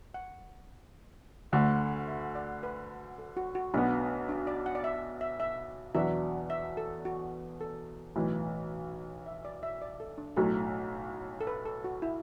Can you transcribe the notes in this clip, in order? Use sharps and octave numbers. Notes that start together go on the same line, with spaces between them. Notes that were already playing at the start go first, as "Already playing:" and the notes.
F#5
D2 D3 A3 E5
E5
D5
B4
A4
F#4
F#4
B1 B2 B3 D4
D4
D5
F#5
D5
E5
E5
E5
E2 B2 F#3 D4 E5
E5
A4
F#4
A4
B1 A2 E3
E5
D5
E5
D5
A4
D4
B1 A2 F#3 A4
A4
B4
A4
F#4
E4